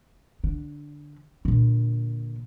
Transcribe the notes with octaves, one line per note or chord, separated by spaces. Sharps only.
D3
A#2 D3